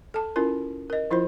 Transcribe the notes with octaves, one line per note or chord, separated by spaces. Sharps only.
A4 A5
C#4 E4 F4 A#4
A#4 D#5
F3 E4 F4 C5